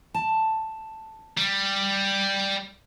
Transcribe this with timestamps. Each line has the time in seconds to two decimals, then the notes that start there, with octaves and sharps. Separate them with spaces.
0.14 A5
1.38 G3